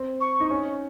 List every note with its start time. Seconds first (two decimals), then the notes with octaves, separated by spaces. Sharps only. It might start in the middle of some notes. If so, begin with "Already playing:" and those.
Already playing: C4
0.21 C#6
0.40 D#4
0.50 C#4